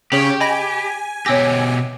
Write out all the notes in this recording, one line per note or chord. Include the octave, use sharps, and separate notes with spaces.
C#3 C#4 G4 G#4 C#5 B6 F#7
D#5 G#5 B5 A#6
B2 G4 C#5 E6 A#6